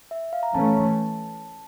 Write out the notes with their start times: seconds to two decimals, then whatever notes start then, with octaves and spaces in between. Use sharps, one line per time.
0.11 E5
0.33 F5
0.43 A#5
0.54 E3 A3 C#4 A5